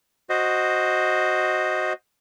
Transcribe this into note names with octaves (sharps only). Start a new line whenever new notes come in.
F#4 C5 D#5